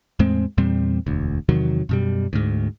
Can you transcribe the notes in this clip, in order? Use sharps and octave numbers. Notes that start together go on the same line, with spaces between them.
E2 A2 G#3 C4
E2 A#2 G3 C4
E1 D2
E2 C3 D#3 F#3
F#2 B2 G3
D2 G#2